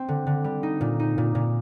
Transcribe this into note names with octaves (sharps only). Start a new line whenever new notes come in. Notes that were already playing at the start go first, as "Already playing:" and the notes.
Already playing: C4
D3
D3
G3
D#4
A#2
D#4
A#2
A#2